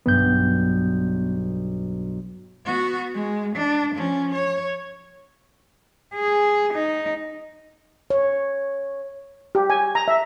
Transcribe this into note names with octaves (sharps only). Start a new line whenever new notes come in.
B1 G2 B3 G6
B3 F#4
G#3
D4
F3 C#4
C#5
G#4
D#4
C#5
G4
G#5
A#5
E5